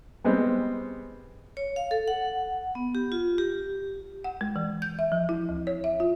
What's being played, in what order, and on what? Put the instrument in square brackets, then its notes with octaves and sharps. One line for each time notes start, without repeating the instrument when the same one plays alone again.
[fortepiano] G3 G#3 B3 C4
[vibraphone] C#5
F5
A4
F#5
B3
G4
F4
G4
[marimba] F#5
G#3
E3
G6
E5
F3
E4
D2
C#5
E5
F4